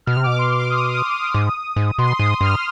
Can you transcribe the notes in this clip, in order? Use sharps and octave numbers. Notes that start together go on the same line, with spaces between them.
B2 F6
C3
B2 D6
C6
D6
D#6
D#6
D#6
G#2
G#2
B2 C6
G#2 D#6
G2 F6